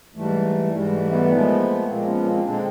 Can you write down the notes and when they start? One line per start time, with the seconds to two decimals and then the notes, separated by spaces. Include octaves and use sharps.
0.14 G#2 E3 G3 A3
0.72 G#2 E3 G3 G#3
0.91 A3
1.10 A3 B3
1.30 A#2 F3 G#3
1.86 A#2 F3 G#3 A#3 C4
2.06 B3 C#4
2.25 A#3 C4
2.44 D3 F3 G#3 C4 D4